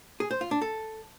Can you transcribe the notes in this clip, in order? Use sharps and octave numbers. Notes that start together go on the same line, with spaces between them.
G#4
C5
F4
D4
A4